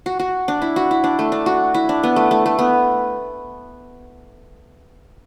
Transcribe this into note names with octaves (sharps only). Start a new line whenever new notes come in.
F#4
F#4
D4
E4
F#4
E4
D4
A3
D4
F#4
E4
D4
B3
A3
A3
A3
B3